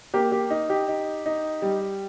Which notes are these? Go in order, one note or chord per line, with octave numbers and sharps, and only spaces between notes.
A#3 G4
G4
D#4
G4
D#4
D#4
G3